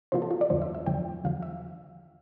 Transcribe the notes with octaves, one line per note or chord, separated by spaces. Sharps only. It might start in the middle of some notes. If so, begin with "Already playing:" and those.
C3 E3 A#3 F4 C5
A4
F4
D5
E2 D3 F3 C5
E5
E5
E2 D3 F3 G5
E2 D3 F3 F5
E5